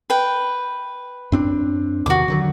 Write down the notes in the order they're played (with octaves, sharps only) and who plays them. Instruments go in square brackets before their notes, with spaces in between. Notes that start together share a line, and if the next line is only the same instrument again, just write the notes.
[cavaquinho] B4 G5
[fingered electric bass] F#2 C4 D4
[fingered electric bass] E2 C3 D#3 [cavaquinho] F#4 D6
[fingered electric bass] D3 D#3 F#3